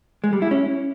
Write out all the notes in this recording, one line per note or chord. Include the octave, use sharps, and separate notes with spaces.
G#3
G3
E4
C#4